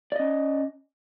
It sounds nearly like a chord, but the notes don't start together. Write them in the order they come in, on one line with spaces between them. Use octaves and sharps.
D5 D#5 C#4